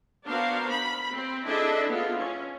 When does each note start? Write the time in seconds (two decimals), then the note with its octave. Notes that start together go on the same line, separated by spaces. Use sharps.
0.25 B3 D4 F#4 A#4 C5 F5
0.69 B5
1.13 C4
1.46 D4 E4 G#4 A4 D#5 E5
1.90 B3 F4
2.20 C#4